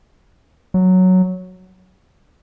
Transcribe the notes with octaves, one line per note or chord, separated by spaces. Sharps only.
F#3